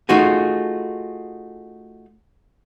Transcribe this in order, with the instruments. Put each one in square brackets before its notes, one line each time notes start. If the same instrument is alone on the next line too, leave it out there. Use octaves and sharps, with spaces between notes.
[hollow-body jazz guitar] A3 D#4 F4 F#4 G#4